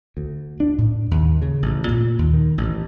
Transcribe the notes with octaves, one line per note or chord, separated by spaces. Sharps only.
D2
D4
A2
D#2
C#3
A1
A#2
D#2
D#3
A1